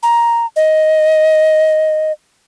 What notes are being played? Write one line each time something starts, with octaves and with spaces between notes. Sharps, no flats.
A#5
D#5